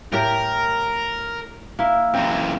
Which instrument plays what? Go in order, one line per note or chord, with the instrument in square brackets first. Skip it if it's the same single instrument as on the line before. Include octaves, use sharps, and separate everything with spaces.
[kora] A2 G4 [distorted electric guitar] A#4
[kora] A#3 E4
[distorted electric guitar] F#2 E3 [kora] C3